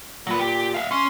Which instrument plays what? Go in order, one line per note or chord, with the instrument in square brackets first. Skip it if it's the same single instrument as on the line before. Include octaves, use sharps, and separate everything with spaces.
[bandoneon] A#2 [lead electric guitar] F#3 B4
[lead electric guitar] G4
E5 F5
[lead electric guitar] C#4 [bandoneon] C6